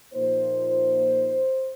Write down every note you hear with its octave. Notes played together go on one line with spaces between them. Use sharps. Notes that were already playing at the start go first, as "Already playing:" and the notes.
A#2 F3 A#3 D#4 C5